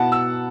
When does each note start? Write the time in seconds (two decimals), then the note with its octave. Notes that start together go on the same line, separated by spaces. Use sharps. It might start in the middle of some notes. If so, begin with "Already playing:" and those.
Already playing: B2 B3 E4 F#5 A5
0.12 E6